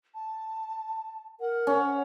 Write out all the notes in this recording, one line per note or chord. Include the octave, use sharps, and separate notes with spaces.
A5
A#4 F#5
C#4